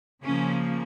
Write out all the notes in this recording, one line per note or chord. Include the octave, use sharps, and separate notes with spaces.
C#3 F3 A#3 C#4